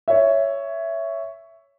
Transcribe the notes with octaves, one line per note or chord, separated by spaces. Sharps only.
C#5 E5